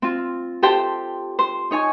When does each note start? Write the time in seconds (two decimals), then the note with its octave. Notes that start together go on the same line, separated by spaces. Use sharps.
0.02 C4 F4
0.63 G4 A4 C5 G5
1.39 C5
1.71 D#4 C#5 G#5